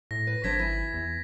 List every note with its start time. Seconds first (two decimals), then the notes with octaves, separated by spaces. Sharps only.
0.11 A2 A#6
0.27 B4
0.44 G#1 F#3 D4 C5 G#6 A#6 B6
0.59 E4 G#5
0.94 E2